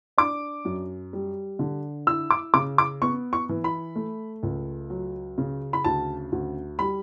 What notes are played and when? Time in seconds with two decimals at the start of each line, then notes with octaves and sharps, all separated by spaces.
0.18 D4 D6
0.65 F#2
1.13 G3
1.59 D3
2.07 E4 E6
2.31 D6
2.54 C#3 D6
2.78 D6
3.02 B3 C#6
3.33 C#6
3.49 E3
3.64 B5
3.96 A3
4.43 C#2
4.90 F#3
5.38 C#3
5.73 B5
5.84 D2 A5
6.32 D2
6.79 G3 B5